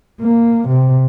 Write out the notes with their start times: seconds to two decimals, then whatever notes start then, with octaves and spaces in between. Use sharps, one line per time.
0.21 A#3
0.68 C3